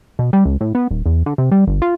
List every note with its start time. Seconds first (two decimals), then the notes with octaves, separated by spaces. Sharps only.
0.19 B2
0.33 G3
0.45 C#2
0.61 A2
0.75 B3
0.91 D#1
1.06 E2
1.26 D3
1.38 C3
1.51 G3
1.67 G1
1.82 F4